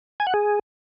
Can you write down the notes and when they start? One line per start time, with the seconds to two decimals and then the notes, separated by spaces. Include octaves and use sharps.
0.20 G#5
0.27 F#5
0.34 G#4